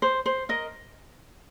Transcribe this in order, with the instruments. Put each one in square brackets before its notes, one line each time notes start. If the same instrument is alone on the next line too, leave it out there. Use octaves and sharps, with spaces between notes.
[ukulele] C5
C5
A#4 D#5